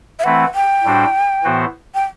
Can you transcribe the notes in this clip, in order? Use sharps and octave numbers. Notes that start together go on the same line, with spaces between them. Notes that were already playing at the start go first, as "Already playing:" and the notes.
E5
E3 A3 C4 E4 B4 F#5
G5
A2 G3 D4 F#4 C5
A2 E3 B3 F#4 C5
G5